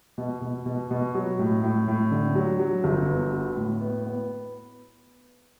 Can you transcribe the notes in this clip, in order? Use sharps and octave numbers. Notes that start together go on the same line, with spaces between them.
B2
B2
B2
B2
F#3
A2
A2
A2
D3
F#3
F#3
G1
B3
F#4
A2
B3
B3